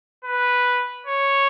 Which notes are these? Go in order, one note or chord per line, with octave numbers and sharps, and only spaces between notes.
B4
C#5